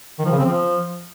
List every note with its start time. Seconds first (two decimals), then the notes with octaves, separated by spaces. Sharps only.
0.19 D#3
0.26 F3
0.32 C#3
0.39 C4
0.45 F3